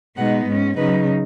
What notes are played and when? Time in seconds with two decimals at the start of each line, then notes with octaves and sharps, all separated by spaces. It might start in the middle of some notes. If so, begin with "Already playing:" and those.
0.17 B2 G#3 B3 D#4 F#5
0.47 G#2 G#3 C#4
0.76 C#3 F#3 D#4 B4